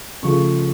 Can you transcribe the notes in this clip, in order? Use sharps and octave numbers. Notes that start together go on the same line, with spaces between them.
C#3 F3 A3 C#6